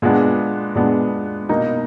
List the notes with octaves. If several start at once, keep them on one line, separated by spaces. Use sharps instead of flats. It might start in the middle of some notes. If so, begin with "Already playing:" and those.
A#2 G#3 B3 D4
A#2 G#3 B3 D4
B2 A#3 D#4